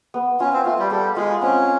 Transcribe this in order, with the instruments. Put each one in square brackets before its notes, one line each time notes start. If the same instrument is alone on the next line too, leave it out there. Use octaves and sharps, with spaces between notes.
[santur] B3
[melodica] C#4 [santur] F4
[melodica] C4
[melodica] A3 [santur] F4
[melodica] G3
[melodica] G3 [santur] A4
[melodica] G#3 [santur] F4
[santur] C4 [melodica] C#4